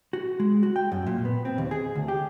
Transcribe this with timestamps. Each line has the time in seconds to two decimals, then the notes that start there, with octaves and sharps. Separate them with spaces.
0.13 F#4
0.40 G#3
0.63 F#4
0.76 G5
0.92 F#2
1.07 A#2
1.25 B3
1.45 C4
1.58 D#2
1.71 G#4
1.95 D2
2.08 G4